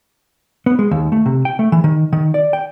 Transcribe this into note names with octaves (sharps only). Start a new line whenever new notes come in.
B3
G#3
D#2
A3
C3
G5
A3
E3
D#3
D#3
D5
G5